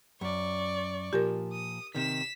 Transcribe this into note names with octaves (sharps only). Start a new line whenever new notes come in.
F#2 D5 C#6
A#2 F3 G4 A#4
D#6
C3 D#3 B6 E7